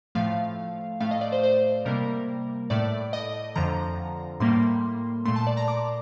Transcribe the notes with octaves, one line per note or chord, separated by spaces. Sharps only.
A2 F3 A3 F5
A2 A3 F5
D#5
D5
C5
C5
C3 G3 A#3 A#4
A2 A3 D5
D#5
F2 D3 F3 A#5
A2 G3 A#3 C6
A#2 A3 C6
A5
D5
A#5
D6